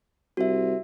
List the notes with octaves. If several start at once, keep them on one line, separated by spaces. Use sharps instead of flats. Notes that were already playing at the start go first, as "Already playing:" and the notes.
C2 F#4 E5